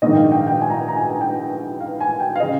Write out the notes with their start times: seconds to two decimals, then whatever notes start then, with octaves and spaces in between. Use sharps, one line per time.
0.02 A#1 G#2 D#3 D#5
0.13 G5
0.17 F5
0.32 G5
0.41 F5
0.47 G5
0.61 G#5
0.70 A#5
0.79 G#5
0.88 A#5
0.96 G#5
1.10 G#5
1.21 G5
1.81 F5
2.01 G#5
2.20 G5
2.36 F5
2.40 C#3 D#5